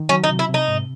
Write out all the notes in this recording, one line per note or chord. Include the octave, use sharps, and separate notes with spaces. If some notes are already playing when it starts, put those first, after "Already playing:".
Already playing: D#3
F#3 C#4
D#4
C3
E4
C3
D#4
G#2